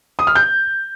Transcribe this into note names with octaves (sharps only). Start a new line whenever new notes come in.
D#6
F6
G6